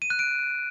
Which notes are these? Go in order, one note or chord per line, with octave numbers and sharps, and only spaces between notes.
D#7
F#6
D7